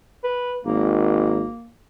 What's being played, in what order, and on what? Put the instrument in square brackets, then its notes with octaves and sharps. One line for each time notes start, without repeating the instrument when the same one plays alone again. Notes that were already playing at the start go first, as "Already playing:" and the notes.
[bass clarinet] B4
[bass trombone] G#1 [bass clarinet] A#3